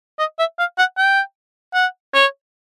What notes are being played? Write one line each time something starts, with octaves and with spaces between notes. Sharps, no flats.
D#5
E5
F5
F#5
G5
F#5
C#5